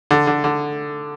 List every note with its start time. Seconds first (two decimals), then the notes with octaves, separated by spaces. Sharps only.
0.11 D3
0.27 D3
0.44 D3